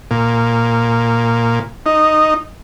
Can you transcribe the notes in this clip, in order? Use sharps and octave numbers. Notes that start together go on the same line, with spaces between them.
A#2
D#4